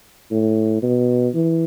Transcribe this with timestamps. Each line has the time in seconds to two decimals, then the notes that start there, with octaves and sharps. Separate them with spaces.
0.31 A2
0.82 B2
1.34 E3